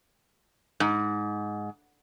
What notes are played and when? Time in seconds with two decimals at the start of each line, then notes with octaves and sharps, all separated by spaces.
0.80 G#2